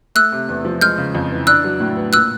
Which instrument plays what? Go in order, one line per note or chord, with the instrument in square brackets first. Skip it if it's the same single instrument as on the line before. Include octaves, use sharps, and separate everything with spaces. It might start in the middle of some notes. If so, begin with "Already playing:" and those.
[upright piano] A3 [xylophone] E6 F#6
[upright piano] C3
E2
F3
[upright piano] G#3 [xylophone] F6 G6
[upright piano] C#3
F2
E3
[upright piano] D4 [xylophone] E6 F#6
[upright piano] F#3
A2
B3
[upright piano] A#2 [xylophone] E6 F#6